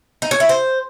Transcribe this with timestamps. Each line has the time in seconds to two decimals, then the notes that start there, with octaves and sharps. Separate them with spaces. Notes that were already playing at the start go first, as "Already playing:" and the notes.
0.22 D#4
0.31 C#5
0.40 E4
0.49 C5